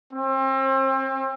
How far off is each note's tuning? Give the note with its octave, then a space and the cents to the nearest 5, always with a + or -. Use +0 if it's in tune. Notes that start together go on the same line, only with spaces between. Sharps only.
C4 +35